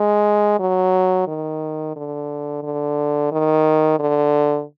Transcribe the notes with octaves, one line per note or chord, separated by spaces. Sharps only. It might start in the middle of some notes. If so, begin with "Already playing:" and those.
Already playing: G#3
F#3
D#3
D3
D3
D#3
D3